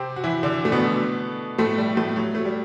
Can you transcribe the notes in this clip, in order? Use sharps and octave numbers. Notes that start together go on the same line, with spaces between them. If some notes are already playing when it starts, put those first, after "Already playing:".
Already playing: C3 C4
F#4
E3 E4
D3 D4
A3
B2 B3
A2 A3
G3
A2 A3
F#3
A3
G3